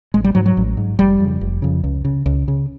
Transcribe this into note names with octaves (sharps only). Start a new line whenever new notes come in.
A1 G#3
G3
G#2 F#3
F#3
A1
G#2
F1 G3
F2 C#3
F1
F2 C#3
C#2
C#3
C#2
C#3